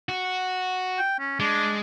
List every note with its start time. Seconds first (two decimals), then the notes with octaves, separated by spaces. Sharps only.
0.09 F#4
0.99 G5
1.19 C#4
1.40 G#3 D4